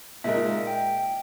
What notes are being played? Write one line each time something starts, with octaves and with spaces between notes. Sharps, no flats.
A#2 G#3 D#4 A#4 E5
G5